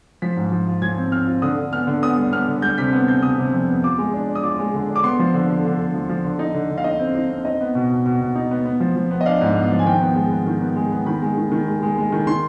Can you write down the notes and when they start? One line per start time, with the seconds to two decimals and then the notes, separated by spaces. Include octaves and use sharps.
0.22 F3 B6
0.37 G#2
0.52 F3
0.67 F4
0.82 F3 G#6
0.98 C4
1.12 C4 F6
1.28 F4
1.42 D3 D#6
1.57 D3
1.72 B3 F6
1.87 D3
2.02 B3 D#6
2.18 G3
2.32 B3 F6
2.48 D3
2.62 G3 G6
2.78 C3 B6
2.93 B3
3.08 C3 G6
3.22 C3 D#6
3.38 C3
3.53 F2
3.68 B3
3.83 F4 D6
3.98 G#3
4.14 D4
4.28 D4
4.35 D#6
4.43 F4 D6
4.59 G#3
4.74 D3
4.89 D4
4.96 D6
5.04 B3 C6
5.19 F3
5.34 D3
5.49 D3
5.65 D3
5.79 D3
5.94 F3
6.09 F3
6.25 D3
6.39 D#4
6.54 D3
6.70 D3
6.78 F5
6.84 D#4 D#5
6.99 C4
7.15 D#4
7.30 C4
7.45 D#4 D#5
7.61 B3
7.75 B2
7.90 B2
8.06 B2
8.21 B2
8.35 D#4
8.51 B3
8.65 B3
8.80 F3
8.96 F3
9.11 B3
9.21 D#5
9.26 D4 F5
9.41 G#2
9.56 B3
9.71 F3
9.79 G#5
9.86 D#3 G5
10.01 B3
10.16 G#3
10.31 B3
10.46 D#3
10.62 B3
10.76 G#3
10.92 B3
11.06 D#3 B5
11.22 G#3
11.37 D#3
11.52 D#3
11.67 G#3
11.83 G#3
11.97 G#3
12.12 D#3
12.27 D#3 C6